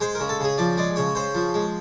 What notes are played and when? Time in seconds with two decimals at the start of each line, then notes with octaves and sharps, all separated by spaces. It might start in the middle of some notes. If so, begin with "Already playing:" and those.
0.01 G#3 C5
0.15 C#3 A#4
0.29 A4
0.40 C#3 G#4
0.58 F3 D5
0.77 G#3 D5
0.96 C#3 C#5
1.15 C#3 C5
1.35 F3
1.54 G#3